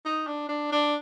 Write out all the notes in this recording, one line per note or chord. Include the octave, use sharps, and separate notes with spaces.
D#4
D4
D4
D4